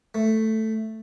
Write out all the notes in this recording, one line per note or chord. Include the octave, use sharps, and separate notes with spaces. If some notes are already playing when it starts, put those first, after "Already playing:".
A3